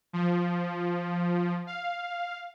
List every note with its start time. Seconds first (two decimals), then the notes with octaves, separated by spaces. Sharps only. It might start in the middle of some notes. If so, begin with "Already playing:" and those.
0.13 F3
1.67 F5